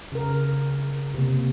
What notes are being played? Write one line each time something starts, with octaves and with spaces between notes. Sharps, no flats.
C#3 A#4
C3 A#3